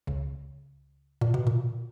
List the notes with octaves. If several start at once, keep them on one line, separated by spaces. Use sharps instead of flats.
C#2 C#3
A#2
B2
A#2